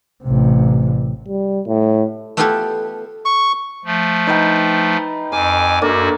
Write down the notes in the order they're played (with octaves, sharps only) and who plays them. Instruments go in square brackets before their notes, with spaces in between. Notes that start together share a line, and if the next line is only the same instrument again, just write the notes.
[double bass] A1 C3
[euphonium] G3
A2
[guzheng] A3 B3 E4 F4 G4 A4
[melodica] C#6
[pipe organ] F3 A3
[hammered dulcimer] D#4 B4 G5
[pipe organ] F2 G#5 D6 [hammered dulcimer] F5
[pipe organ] F#2 F#4 [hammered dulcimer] A#3 D4 A4